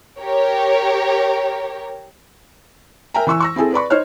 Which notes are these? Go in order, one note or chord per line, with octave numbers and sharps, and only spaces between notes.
G4 A#4 C#5
A#4 E5 G5 G#5 A#5
E3 E4 C#6 E6
C#6 E6 A#6
C4 E4 G#4 A4
B4 D5 B5 C#6
D#4 C5 C#5 F6